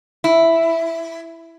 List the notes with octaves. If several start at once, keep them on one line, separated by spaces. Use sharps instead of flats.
E4